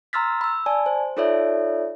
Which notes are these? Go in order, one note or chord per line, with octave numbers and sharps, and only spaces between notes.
A#5 C6 E6 F6 A6 B6
B5 E6
D5 G#5 A5
C5
D#4 F4 A4 C#5 D5 E5